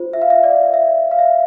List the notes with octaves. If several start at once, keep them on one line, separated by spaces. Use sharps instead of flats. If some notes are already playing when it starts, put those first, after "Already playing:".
Already playing: F4 C5
E5
F5
E5
D5
E5
F5
E5